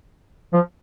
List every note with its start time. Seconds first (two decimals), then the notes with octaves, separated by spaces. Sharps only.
0.53 F3